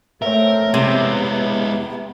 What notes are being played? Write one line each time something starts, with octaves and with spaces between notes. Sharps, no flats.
A3 C4 A#4 C#5 E5
C3 G#3 B3 E4